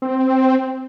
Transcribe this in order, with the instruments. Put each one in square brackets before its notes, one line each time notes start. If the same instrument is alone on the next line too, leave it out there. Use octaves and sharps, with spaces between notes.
[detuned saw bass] C4